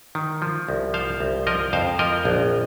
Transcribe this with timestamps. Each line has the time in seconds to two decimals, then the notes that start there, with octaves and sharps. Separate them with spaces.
0.15 D#3
0.42 F3
0.69 C2
0.94 F3 C5 F5
1.20 C2
1.47 F3 A#4 D#5
1.73 F2 C5 F5
1.99 F3 A#4 D#5
2.25 A#1